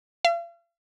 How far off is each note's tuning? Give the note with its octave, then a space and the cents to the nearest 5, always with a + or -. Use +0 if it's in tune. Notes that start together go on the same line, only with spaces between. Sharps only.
F5 -40